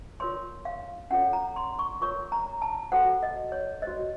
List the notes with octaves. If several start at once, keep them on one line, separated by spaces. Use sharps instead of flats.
F4 A#4 C#5 C6
F5
C#4 F4 A4 C#5 F#5
A#5
C6
C#6
F4 A#4 C#5 C#6
A#5
A5
F#4 A4 C5 F#5
D#5
C#5
F#4 C5 D#5